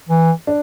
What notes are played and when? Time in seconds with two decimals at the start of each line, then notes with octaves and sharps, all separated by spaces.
0.09 E3
0.47 D4